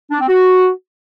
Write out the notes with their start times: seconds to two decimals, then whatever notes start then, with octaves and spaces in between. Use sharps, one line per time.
0.11 D4
0.20 C4
0.28 F#4